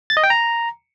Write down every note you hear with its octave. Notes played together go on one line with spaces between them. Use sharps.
A6
D#5
G5
A#5